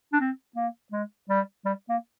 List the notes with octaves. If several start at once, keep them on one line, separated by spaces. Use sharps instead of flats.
D4
C4
A#3
G#3
G3
G3
A#3